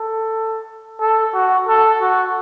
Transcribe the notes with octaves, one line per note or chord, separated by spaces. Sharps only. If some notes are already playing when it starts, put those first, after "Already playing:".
Already playing: A4
A4
F#4
A4
F#4